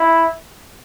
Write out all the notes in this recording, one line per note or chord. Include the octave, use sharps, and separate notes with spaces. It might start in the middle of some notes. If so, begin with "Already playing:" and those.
Already playing: E4